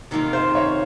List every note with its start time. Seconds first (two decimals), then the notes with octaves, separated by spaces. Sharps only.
0.11 C3 D#3 A#3 F4
0.33 C5
0.55 C#5